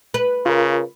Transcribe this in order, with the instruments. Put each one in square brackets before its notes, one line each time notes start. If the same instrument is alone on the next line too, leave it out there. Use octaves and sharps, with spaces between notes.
[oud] B4
[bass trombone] C#3 [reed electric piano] F4 A#4